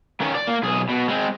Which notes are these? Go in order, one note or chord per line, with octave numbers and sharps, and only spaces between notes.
D#3 C#4
D5
A#3
B1 G#4
B2
G#3 C4